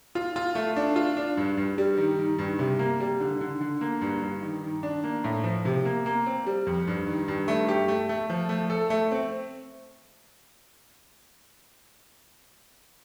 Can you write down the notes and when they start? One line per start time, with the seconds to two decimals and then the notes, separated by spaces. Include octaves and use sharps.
0.15 F4
0.36 F4
0.55 A3
0.76 D4
0.96 F4
1.17 D4
1.37 G2
1.57 G2
1.78 G3
1.98 D#3
2.19 D#3
2.39 G2
2.59 C3
2.79 A#3
3.00 G3
3.20 D3
3.41 D3
3.61 D3
3.81 A#3
4.02 G2
4.22 G2
4.43 D#3
4.63 D#3
4.83 D4
5.04 A#3
5.24 A2
5.44 F3
5.65 C3
5.85 A#3
6.06 A#3
6.26 C4
6.46 G3
6.66 F2
6.87 G2
7.07 D#3
7.28 G2
7.48 A3
7.68 G4
7.88 A3
8.09 A3
8.30 F3
8.49 A3
8.70 A4
8.90 A3
9.11 C4